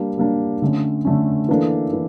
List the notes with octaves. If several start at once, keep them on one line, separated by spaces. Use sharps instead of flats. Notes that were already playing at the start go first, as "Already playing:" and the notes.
Already playing: G3 A#3 D4
G3 A#3 D4
D3 A3 C#4
D3 A3 C#4
E3 A#3 D4 A4
E3